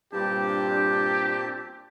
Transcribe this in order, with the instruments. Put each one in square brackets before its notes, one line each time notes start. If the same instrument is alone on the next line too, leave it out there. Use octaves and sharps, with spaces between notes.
[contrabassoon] G2 [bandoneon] A#2 C4 A5 [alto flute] D4 [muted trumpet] G4